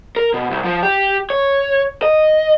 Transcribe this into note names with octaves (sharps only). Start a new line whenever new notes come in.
A#4
B2
C2
F3
G4
C#5
D#5